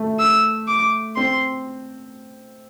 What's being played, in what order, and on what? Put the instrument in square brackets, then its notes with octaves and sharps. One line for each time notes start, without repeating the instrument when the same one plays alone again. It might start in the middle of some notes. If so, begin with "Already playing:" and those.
Already playing: [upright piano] A3
[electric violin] E6
D6
[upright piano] C4 [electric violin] C6